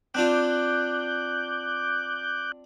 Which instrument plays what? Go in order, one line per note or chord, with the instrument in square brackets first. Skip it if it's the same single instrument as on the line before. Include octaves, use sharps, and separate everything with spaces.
[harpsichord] C4 D4 F4 [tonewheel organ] D6 F#6 G6